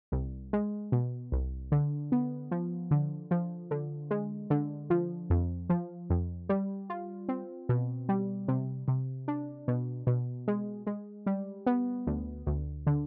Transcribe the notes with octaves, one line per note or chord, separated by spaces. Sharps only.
C2
G#3
B2
C2
D3
B3
F3
D3
F3
D3
G#3
D3
F3
F2
F3
F2
G3
F4
C4
B2
G3
C3
C3
D4
B2
B2
G#3
G#3
G3
B3
D2
D2
D3